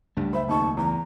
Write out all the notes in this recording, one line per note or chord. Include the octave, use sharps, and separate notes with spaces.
F#1 C#2 G2 A3
C5 E5 B5
D#1 D#4 A5 C#6
E2 A#5